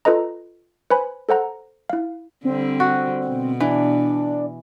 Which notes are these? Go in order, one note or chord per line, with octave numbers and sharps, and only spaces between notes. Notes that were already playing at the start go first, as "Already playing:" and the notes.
F4 A4 B4 D#5 A#5
B4 C5 G#5 B5
A4 C5 F#5 A#5
E4 F5
D3 G3 C4
F#4
B2
E3 D4